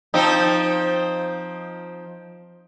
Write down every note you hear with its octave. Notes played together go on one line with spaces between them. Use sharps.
F3 C4 D#4